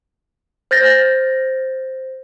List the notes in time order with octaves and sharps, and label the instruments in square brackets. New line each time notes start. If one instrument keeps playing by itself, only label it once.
[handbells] C5 G6 A6 A#6